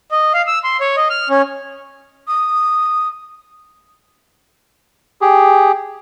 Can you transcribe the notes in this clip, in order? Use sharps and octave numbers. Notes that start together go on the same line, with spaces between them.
D#5
F5
E6
C6
C#5
D#5
F6
C#4
D#6
G4 G#4